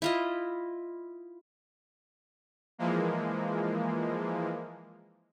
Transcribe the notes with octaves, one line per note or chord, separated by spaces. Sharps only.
E4 F4 D#5
E3 F3 G#3 A#3